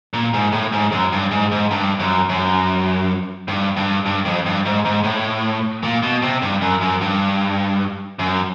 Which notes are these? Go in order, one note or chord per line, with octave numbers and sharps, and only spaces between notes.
A#2
G#2
A2
G#2
F#2
G2
G#2
G#2
G2
F#2
F#2
G2
G2
G2
F2
G2
G#2
G#2
A2
A#2
B2
C3
G2
F#2
F#2
G2
F#2